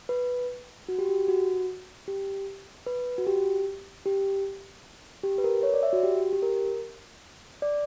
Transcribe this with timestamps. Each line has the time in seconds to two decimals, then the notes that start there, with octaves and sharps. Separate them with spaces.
0.09 B4
0.89 F#4
0.99 G4
1.09 G4
1.28 F#4
2.08 G4
2.86 B4
3.18 F#4
3.27 G4
4.06 G4
5.23 G4
5.38 B4
5.44 A#4
5.63 C#5
5.74 D5
5.83 E5
5.93 F#4
6.03 G4
6.33 G4
6.42 A#4
7.62 D5